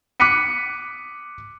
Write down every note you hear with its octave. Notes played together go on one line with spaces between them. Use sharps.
D6 F#6 B6 C#7 D#7